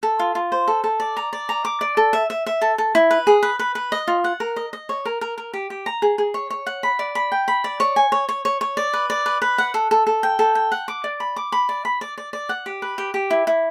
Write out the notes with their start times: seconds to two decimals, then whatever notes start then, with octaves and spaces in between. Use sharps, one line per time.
0.03 A4
0.19 F4
0.35 F4
0.52 C5
0.68 A4
0.84 A4
1.00 D5
1.17 A#5
1.33 D5
1.49 A#5
1.65 D6
1.81 D5
1.97 A4
2.13 E5
2.30 E5
2.46 E5
2.62 A4
2.78 A4
2.95 E4
3.11 B4
3.27 G#4
3.43 B4
3.59 B4
3.75 B4
3.92 D#5
4.07 F4
4.24 F#5
4.40 A#4
4.56 D#5
4.73 D#5
4.89 C#5
5.05 A#4
5.21 A#4
5.38 A#4
5.53 G4
5.70 G4
5.86 A#5
6.02 G#4
6.18 G#4
6.34 C#5
6.50 C#5
6.66 F#5
6.83 B5
6.99 D5
7.15 B5
7.32 G5
7.48 B5
7.64 D5
7.80 C#5
7.96 G#5
8.12 C#5
8.29 C#5
8.45 C#5
8.61 C#5
8.77 D5
8.93 B4
9.10 D5
9.26 B4
9.42 B4
9.58 F#5
9.74 A4
9.91 A4
10.07 A4
10.23 G5
10.39 A4
10.55 G5
10.72 F#5
10.88 D6
11.04 D5
11.20 B5
11.36 D6
11.52 B5
11.69 D5
11.85 B5
12.01 D5
12.18 D5
12.33 D5
12.49 F#5
12.66 G4
12.82 B4
12.98 G4
13.14 G4
13.30 E4
13.47 E4